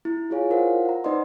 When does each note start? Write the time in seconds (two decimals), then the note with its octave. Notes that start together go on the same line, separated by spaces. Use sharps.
0.05 E4
0.30 E4 F4 G#4 C#5 F5 G#5
0.50 E4 F4 A#4 C5 F5 F#5
0.85 F#5 A#5
1.04 D#4 B4 C5 D5 D#5 C6